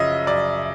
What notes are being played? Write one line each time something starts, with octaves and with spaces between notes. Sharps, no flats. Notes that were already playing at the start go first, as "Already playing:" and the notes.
Already playing: F#2 C#3 F3 D#5 E5
F#2 D5